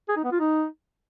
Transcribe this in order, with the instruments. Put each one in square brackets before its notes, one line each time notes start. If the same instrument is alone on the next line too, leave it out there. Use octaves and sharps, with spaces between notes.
[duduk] G#4
D#4
B3
F4
D#4